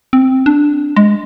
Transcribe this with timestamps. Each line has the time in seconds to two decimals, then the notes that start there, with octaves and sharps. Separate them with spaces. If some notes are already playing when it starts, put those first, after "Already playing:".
0.13 C4
0.46 D4
0.96 G#3